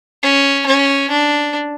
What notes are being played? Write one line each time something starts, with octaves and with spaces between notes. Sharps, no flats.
C#4
C#4
D4